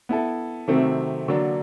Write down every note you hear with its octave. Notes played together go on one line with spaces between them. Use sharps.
B3 E4 A4
C3 D#3 F#3 A3 C4
D3 F#3 A#3 D4